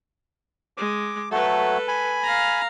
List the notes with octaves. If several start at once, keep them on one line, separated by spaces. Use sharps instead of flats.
G#3 D6
F#3 A3 A4 B4
G#5 B5
F5 A#5